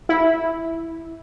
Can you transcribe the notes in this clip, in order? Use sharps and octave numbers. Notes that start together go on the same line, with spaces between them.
E4